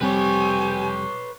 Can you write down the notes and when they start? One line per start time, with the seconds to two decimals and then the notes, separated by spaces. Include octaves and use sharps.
0.01 F1 G3 C4 G4 B4 C#5 G#5